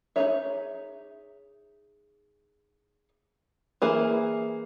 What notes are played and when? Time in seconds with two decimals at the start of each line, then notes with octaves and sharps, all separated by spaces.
0.16 D#4 G#4 C#5 E5
3.82 E3 A#3 E4 G#4